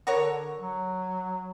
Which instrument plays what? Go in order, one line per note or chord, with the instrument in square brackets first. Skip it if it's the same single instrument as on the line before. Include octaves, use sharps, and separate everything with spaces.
[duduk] D3 [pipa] F#4 A#4 C#5
[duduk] F#3